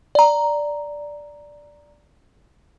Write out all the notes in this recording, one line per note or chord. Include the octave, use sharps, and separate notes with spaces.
D5 A#5